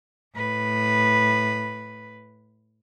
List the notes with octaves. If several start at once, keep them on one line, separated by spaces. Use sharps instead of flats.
A2 B4